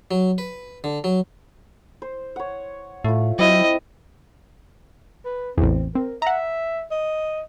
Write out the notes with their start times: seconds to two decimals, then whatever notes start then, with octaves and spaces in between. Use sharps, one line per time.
0.11 F#3
0.38 B4
0.84 D3
1.04 F#3
2.02 C5
2.36 C#5 F#5
3.04 A2 A3 F4
3.39 F#3 C4 E4 D#5 G5
5.25 B4
5.58 A1 E2 C4
5.95 C4 A#4
6.22 E5 F#5 A#5
6.91 D#5